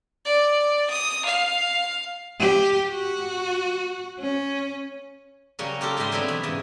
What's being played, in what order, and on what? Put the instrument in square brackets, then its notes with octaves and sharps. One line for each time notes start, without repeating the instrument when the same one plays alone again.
[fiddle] D5
D#6
F5
[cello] G4
F#4
C#4
[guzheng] C#3 F#3 G3 A#3 C#4
A#3 F4 G4 A4 A#4
G#2 G3 G#3 E5 G5 C6
D3 F#3 G3 B3 C4 E4
B2 E3 B5
G#2 C#3 E3